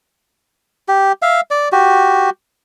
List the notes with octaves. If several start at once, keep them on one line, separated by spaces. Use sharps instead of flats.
G4
E5 F5
D5
F#4 G4